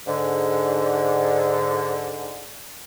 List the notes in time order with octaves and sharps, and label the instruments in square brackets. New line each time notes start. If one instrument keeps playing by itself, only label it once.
[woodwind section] G#2 D3